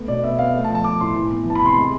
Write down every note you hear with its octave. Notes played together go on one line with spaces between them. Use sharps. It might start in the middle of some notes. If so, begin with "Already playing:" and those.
Already playing: A3 B3
B2 D5
B3 E5
B3 F5
A3
A5
F3
A5
F3 D6
A2 C6
E3
B3
E3 A5
B5
C3 C6
G#3 C6